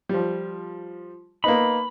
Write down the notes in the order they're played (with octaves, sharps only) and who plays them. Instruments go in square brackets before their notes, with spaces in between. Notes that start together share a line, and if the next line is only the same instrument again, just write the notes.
[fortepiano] F3 G3
[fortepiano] A#3 B3 D#4 [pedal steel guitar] B5